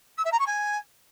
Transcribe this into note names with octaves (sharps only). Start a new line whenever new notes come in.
E6
E5
A#5
C#6
G#5